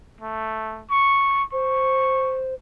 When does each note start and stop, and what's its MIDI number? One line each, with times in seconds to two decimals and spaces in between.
0.20 0.82 57
0.90 1.43 85
1.52 2.54 72
1.52 2.39 85